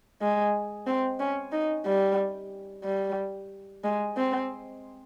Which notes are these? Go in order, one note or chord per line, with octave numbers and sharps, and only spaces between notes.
G#3
C4
C#4
D#4
G3
G3
G#3
C4